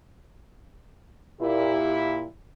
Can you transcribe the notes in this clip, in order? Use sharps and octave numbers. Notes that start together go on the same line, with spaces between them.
A#2 E4 G4